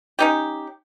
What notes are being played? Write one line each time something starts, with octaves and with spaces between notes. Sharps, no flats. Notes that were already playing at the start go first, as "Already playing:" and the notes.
C#4 D#4 G4